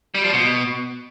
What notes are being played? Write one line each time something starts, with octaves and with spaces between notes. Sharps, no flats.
G3
F3
B2